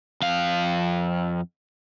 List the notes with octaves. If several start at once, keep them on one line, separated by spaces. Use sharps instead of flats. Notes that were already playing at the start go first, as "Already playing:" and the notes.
F2 F5